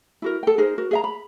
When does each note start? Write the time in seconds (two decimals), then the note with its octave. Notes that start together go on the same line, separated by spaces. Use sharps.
0.22 E4 F#4 A#4
0.43 A4 G5
0.58 D#4 G#4 A#4 C5
0.78 F#4 A#4
0.91 G#4 E5 A#5
1.04 B5